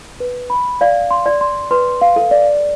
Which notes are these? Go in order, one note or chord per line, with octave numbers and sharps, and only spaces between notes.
B4
B5
D5 F5
C6
D5
C6
B4 C6
F5
A4
D5